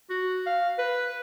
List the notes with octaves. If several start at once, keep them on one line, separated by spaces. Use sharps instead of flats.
F#4
F5
B4